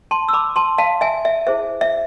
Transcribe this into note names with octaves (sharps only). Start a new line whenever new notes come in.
A5 C6
E6
B5 D6
A5 C6
F5 A5
E5 G#5
E5
E4 G#4 C5 E5
E5